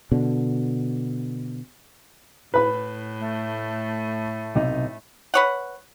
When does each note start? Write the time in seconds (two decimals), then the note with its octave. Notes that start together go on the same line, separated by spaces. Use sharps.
0.12 B2 D3
2.54 A2 B4 B5
3.20 A3
4.56 B1 C3 D#4
5.34 B4 C#5 F#5